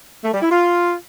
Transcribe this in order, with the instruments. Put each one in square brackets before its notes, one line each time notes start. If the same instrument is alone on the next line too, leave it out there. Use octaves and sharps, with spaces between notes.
[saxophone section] A3
G3
E4
F4